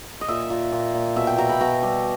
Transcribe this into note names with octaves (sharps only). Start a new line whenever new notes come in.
D#5
A#2 E5
A#2
A#2
A#2
B2 E5
G5
B2 A#5
B5
B2 A#5
G3